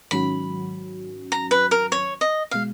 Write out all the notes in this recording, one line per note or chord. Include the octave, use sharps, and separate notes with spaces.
G#2 D#3 F#3 C#4 F#4 B5
A#5
B4
A#4
C#5
D#5
B2 G#3 F5